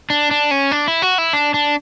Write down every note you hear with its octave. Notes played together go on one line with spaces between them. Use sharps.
D4
D4
C#4
D4
E4
F#4
E4
D4
D4